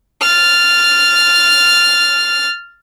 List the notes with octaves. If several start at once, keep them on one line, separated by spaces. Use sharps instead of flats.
F6 A6